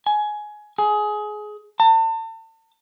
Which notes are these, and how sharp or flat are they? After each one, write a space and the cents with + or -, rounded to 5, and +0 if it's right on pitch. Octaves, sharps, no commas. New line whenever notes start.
G#5 +15
G#4 +20
A5 +40